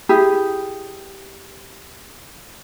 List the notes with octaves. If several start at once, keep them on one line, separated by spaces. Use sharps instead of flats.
E4 G4 G#4